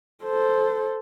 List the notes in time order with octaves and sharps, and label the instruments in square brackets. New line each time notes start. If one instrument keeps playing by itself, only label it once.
[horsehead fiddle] A4 C5